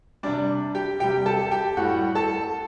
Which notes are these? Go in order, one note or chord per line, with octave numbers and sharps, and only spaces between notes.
C3 G3 D4 D5
G4 G5
C3 G3 G4 G5
A4 A5
G4 G5
A2 G3 F#4 F#5
A4 A5